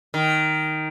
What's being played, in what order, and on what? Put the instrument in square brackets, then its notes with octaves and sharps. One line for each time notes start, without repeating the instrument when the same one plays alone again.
[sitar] D#3